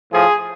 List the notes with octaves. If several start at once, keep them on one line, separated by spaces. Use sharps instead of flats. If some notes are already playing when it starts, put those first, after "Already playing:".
A2 F3 G#4